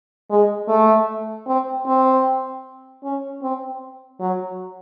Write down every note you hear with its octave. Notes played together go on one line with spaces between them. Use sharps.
G#3
A3
C4
C4
C#4
C4
F#3